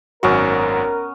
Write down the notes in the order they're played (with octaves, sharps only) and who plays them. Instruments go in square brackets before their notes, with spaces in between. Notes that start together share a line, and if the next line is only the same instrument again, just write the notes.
[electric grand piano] G#1 F#2 F#4 [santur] B3 C#4 [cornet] A#4